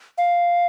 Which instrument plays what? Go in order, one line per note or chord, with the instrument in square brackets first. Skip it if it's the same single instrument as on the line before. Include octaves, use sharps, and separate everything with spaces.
[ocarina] F5